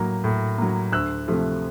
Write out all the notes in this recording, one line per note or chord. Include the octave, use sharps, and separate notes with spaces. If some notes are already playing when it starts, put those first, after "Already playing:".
Already playing: A2 F#3 A#3
A2
F#3 A#3
D2 E6 F#6
C3 F3 A3